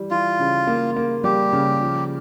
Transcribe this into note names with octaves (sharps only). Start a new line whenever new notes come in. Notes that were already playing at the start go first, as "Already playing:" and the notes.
Already playing: E3 G3
E3 F4
C#3
A#3
A#3
G3 G4
C#3
F3